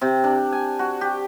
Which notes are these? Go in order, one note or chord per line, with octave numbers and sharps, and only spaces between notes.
C3
D4
G#5
F#4
G4